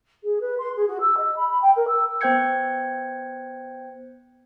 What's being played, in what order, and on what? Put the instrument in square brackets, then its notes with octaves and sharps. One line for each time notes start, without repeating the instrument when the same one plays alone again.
[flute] G#4
B4
C6
G#4
F#4
E6
D#5
B5
B5
G5
A#4
E6
[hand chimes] B3 C5 G5 G6 G#6 C#7